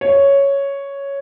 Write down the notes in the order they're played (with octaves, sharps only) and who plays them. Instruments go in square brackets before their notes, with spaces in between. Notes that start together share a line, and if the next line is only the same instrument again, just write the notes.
[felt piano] C#5